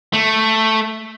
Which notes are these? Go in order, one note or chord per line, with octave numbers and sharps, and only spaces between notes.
A3